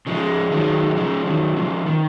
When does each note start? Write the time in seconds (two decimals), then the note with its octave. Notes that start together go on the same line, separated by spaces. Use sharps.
0.07 C#3 F3 G#3
0.52 D#3 F#3
0.96 C#3 F3
1.26 D#3 F#3
1.56 C#3 F3
1.86 D#3